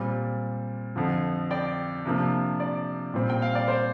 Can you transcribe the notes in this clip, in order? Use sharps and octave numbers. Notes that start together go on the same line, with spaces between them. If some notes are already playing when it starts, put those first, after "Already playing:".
Already playing: A#2 G3 C4
F2 D3 F3
D5 G5
C3 F3 A#3 D4
D5
A#2 G3 C4
G5
F5
D5
C5